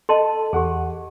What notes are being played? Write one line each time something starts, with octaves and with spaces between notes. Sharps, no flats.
A4 D#5 A5 C6
E2 G4 G#4 F#5